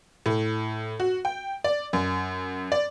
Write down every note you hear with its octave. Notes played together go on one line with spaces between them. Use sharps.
A2
F#4
G5
D5
F#2
D5